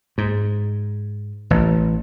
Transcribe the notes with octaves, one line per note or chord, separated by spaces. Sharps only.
G#2
A1